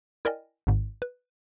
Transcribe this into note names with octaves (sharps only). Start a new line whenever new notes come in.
E4 A#4 D5 D#5 G5 G#5
G#1 G#2
B4